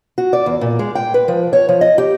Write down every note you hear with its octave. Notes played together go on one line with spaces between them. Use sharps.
F#4
D5
E2
A#2
G#3
G5
B4
F3
C#5
F3
D#5
G4